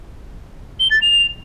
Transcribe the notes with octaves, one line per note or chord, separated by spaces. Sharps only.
G7
A6
F7